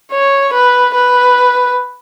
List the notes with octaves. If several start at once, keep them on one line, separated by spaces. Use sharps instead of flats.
C#5
B4
B4